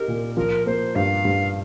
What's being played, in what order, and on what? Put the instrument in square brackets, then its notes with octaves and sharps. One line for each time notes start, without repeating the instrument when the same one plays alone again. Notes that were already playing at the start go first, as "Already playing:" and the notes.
Already playing: [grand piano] D#4 G4 [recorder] A#4
[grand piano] A#2
[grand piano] F3 [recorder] A#4
[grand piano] A#3 [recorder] C5
[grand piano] G2 [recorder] F5
[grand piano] G2